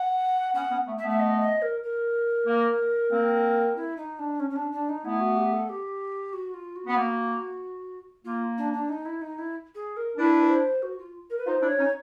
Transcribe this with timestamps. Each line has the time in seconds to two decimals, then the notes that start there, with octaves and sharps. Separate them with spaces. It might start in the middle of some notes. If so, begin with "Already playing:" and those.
Already playing: F#5
0.54 B3 C#4 F#5
0.70 B3 C#4
0.87 A3 B3
0.98 E5
1.03 A3 B3
1.09 E5
1.19 D#5
1.40 D#5
1.62 A#4
1.83 A#4
2.47 A#3
3.11 A#3 C4
3.76 E4
3.97 D#4
4.19 D4
4.39 C#4
4.50 C#4
4.56 D4
4.71 D4
4.89 D#4
5.03 A3 B3 E4
5.20 F#4
5.36 G4
5.52 A4
5.69 G4
6.33 F#4
6.53 F4
6.75 F#4
6.86 B3
6.97 A#3
8.24 A#3 F4
8.57 D4
8.73 D4
8.89 D#4
9.05 E4
9.21 D#4
9.38 E4
9.74 G#4
9.96 A#4
10.17 D4 E4 B4
10.45 B4
10.49 C5
10.82 F#4
10.98 F4
11.30 A#4
11.38 B4
11.46 D#4 F4 C5
11.62 D4 E4
11.67 C#5
11.78 C#4 D#4